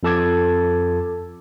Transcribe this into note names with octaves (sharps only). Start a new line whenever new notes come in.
F2 F4 A4 A5 D6 G#6